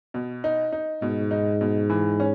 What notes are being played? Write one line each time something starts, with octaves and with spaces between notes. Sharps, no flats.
B2
D#4
D#4
G#2 B2
D#4
B2
E3
C#4